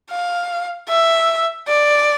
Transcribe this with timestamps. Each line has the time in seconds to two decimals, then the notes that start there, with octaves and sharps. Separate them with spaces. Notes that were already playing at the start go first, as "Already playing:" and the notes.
0.11 F5
0.89 E5
1.68 D5